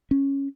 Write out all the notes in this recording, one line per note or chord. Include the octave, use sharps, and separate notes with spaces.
C#4